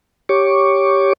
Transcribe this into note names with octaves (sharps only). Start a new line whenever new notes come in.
G4 C#5 C#6 D6